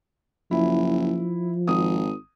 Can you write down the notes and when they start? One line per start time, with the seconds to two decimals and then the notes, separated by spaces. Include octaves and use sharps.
0.51 F#1 F3 E4
1.67 G#1 D#6